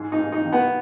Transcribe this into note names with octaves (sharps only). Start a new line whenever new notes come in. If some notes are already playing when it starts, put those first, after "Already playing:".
Already playing: G#2
D#4
G#2
D#4
D#3
B3